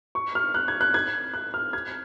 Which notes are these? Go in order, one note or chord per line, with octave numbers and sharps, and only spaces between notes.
C#6
F6
F#6
G#6
F#6
G#6
F#6
F6
G#6